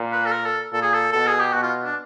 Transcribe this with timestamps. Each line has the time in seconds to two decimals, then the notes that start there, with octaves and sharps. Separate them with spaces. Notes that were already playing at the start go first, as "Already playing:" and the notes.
Already playing: A#2
0.12 B4
0.26 A4
0.32 A#4
0.46 A4
0.72 A#2 A4
0.82 G#4
0.93 A4
1.12 B2 A4
1.27 G#4
1.40 G4
1.53 B2 F#4
1.63 F4
1.84 D4